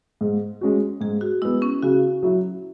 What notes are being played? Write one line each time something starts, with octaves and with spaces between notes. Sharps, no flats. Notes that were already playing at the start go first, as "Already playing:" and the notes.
G#2
G#3 C#4 F#4
G#2 G#4
F#4
G#3 B3 E4
C#4
C#3 F#4
F#3 E4